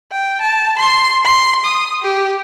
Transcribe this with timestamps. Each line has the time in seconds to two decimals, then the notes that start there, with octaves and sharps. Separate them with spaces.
0.12 G5
0.41 A5
0.78 C6
1.25 C6
1.65 D#6
2.02 G4